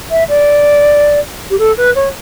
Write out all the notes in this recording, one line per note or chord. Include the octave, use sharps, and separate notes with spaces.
E5
D5
G4
A4
B4
C#5